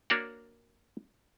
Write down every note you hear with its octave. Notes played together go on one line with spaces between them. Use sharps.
A#3 D4 F#4 C#5 D5 F#5